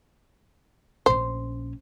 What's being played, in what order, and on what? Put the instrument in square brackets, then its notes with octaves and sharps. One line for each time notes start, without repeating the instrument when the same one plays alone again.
[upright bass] A#1 C#4 [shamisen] C5